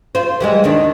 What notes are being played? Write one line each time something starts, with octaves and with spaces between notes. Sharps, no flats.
F4 C5
E3 G3 G#3
D#2 D#3 D4